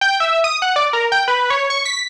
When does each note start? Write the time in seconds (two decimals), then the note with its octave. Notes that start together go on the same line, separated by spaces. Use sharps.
0.01 G5
0.20 E5
0.44 D#6
0.62 F#5
0.76 D5
0.93 A#4
1.12 G5
1.28 B4
1.50 C#5
1.70 C#6
1.85 B6